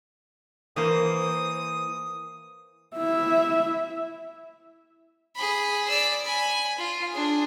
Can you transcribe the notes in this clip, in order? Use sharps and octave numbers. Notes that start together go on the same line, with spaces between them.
E3 A#3 C5 D#6
E4 E5
G#4 B5
D5 E6
G#5 B5
F4
D4 G#4